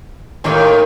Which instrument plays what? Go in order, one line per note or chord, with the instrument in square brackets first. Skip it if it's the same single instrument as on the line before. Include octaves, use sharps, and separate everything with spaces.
[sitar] D#2 A2 D#3 [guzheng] G#3 A#3 G4